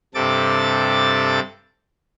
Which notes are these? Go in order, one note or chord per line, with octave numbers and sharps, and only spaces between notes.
G2 C3 A4 D6 A6